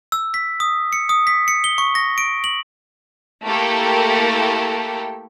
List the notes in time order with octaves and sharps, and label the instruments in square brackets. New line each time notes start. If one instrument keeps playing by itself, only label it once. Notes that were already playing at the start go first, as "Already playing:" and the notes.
[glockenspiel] E6
B6
D#6
C#7
D#6
B6
C#7
G7
C#6
A#6
D7
F#7
[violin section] A3 A#3 E4 G4 A4 A#4